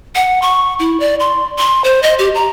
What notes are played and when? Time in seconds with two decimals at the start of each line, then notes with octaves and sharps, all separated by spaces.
0.15 F#5
0.42 C#6
0.79 E4
1.00 D5
1.20 C6
1.58 C6
1.84 C5
2.03 D#5
2.19 G4
2.35 A#5